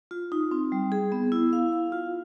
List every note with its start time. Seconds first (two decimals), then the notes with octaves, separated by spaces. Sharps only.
0.11 F4
0.32 D#4
0.51 C4
0.72 G3
0.92 G#4
1.12 B3
1.32 E4
1.53 F5
1.72 F5
1.92 F4